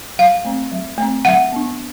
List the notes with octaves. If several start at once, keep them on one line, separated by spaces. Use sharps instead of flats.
F#3 F5
A3 C4
F#3
A3 C4
F#3 F#5
B3 D4